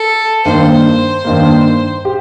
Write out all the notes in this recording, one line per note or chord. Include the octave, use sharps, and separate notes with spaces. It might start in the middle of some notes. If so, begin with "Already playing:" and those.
Already playing: A4
G2 D#3 A#3 C5
G2 D#3 A#3
G4